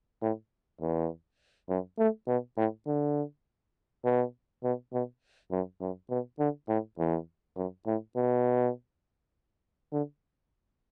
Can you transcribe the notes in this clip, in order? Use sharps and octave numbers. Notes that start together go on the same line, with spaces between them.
A2
E2
F#2
A3
B2
A2
D3
B2
B2
B2
F#2
F#2
B2
D3
A2
E2
F#2
A2
B2
D3